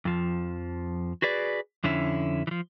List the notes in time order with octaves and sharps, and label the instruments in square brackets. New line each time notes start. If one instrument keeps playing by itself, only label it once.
[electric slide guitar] F2 F3
F#4 G#4 B4 D5
F2 D3 C#4 E4
E3 F3